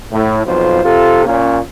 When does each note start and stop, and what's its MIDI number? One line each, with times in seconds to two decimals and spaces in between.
0.12 0.42 45
0.46 0.82 35
0.46 0.82 41
0.46 0.82 65
0.46 0.82 72
0.84 1.23 48
0.84 1.23 65
0.84 1.23 69
1.26 1.59 46
1.26 1.59 58
1.26 1.59 61